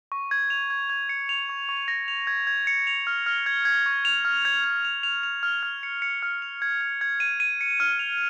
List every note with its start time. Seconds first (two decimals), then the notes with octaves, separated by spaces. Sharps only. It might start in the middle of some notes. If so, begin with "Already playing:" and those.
0.12 C#6
0.31 G#6
0.50 F7
0.70 G#6
0.90 G#6
1.09 C#7
1.29 F7
1.49 C#6
1.69 C#6
1.88 A#6
2.08 F7
2.27 G#6
2.47 G#6
2.67 C#7
2.87 F7
3.07 F6
3.26 F6
3.46 G#6
3.65 G#6
3.86 C#6
4.05 F7
4.25 F6
4.45 G#6
4.64 G#6
4.85 F7
5.03 F7
5.23 F7
5.43 F6
5.63 F6
5.83 C#7
6.02 C#7
6.23 F6
6.42 F7
6.62 G#6
6.81 G#6
7.01 G#6
7.20 D#7
7.40 D#7
7.61 C#7
7.80 F6
7.99 F7